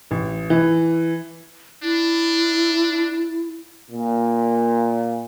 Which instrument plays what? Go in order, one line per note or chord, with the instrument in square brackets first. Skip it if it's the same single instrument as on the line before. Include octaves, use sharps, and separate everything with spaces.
[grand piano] A1
E3
[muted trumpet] D4 [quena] E4
[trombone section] A#2